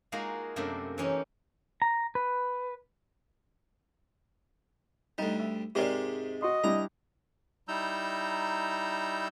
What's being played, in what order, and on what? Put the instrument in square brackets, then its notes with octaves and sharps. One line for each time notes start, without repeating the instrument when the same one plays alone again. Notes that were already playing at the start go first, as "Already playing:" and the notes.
[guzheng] G#3 A#3 D#4 F4 F#4
F#2 C3 A3 A#3 C4 D4
E3 C#4 D#4 G4
[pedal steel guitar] A#5
B4
[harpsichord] D2 G3 [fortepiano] D#4
[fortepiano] E5
[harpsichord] G#2 C3 G#3 [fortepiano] G4 A#4 D5
[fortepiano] F#4 C6 [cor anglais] D#5
[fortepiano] G3 D4 E4 [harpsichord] A#5
[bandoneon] G3 D#4 E4 A#5 E6 G6